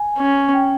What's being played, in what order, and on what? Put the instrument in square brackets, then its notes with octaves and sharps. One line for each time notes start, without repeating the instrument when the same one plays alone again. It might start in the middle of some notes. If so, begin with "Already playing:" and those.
Already playing: [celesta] G#5
[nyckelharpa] C#4
[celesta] G5